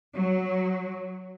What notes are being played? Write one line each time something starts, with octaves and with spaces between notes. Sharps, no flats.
F#3